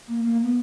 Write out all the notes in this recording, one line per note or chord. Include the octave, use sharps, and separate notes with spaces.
A#3
A#3
B3